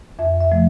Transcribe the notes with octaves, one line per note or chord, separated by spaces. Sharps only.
F2 E5
E5
C3 F3 A3